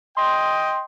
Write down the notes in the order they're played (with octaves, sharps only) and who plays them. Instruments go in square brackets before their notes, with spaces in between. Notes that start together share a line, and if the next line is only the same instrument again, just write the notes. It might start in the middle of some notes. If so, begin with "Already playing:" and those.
[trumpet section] D#5 G5 [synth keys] C6